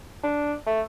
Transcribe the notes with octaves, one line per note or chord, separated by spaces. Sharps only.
D4
A3